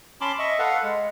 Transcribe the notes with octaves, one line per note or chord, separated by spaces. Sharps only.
C#4 A5 B5 C6 D6
D#5 E5 C#6
A4 B4 F5 F#5
G#3